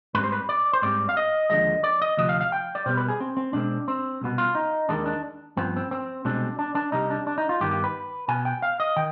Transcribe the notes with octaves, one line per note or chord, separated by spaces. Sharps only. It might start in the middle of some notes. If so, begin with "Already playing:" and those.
G#2 G3 C4 B4
C5
B4
D5
C5
G#2 G3 C4 D5
F5
D#5
D#2 D3 F3 G#3 D#5
D5
D#5
D2 C3 F3 D#5
F5
F5
G5
D5
B2 G3 B3 C5
B4
G#4
C4
C4
B2 G#3 C4 D4
C4
C2 B2 B3
F4
D#4
D#2 D#3 G#3 D4
D4
G2 F3 B3 C4
C4
C4
C2 B2 G#3 C4 D4
D4
D4
C2 C3 G3 D#4
D4
D4
D#4
F4
G2 D#3 B3 G4
G4
B4
B2 B3 G#5
G5
F5
D#5
D#3 G5